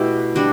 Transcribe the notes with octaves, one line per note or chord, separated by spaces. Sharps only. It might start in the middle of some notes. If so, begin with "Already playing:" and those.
Already playing: B2 A3 E4 G4
G3 D4 F#4